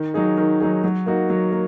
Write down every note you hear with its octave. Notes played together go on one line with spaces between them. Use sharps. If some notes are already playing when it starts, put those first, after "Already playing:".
Already playing: D#3
F#3 D#4 G#4
D#3
F#3 D#4 G#4
F#3
A#3 D#4 F#4
F#3
A#3